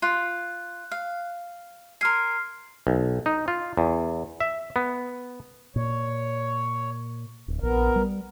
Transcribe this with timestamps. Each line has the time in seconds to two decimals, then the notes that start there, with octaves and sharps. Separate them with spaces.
0.02 F4 F#6
0.91 F5
2.01 A#4 G#5 C6 F6 C7
2.87 B1
3.26 D#4
3.48 F4
3.77 E2
4.40 E5
4.76 B3
5.76 A#2 C#5
7.48 D1
7.62 A#1 B3 A#4
7.96 G3